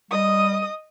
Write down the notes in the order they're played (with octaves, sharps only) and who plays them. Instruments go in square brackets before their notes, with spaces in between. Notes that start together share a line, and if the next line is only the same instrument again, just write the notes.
[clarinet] G3 [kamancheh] D#5 D#6